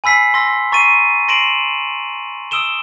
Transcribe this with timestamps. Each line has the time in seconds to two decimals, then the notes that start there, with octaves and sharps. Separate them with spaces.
0.04 G#5 B5 E6 B6 C7
0.34 C6 E6 A#6
0.72 A#5 C#6 A6 C7 D#7
1.28 C6 A#6 C7 D7 E7 F#7
2.51 D#6 E6 D7 E7 G7